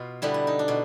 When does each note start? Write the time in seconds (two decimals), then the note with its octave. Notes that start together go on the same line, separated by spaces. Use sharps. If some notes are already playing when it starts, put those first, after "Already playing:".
Already playing: B2 F4
0.22 D3 G3 B3 E4
0.34 E4
0.47 D#4
0.59 D4
0.68 B2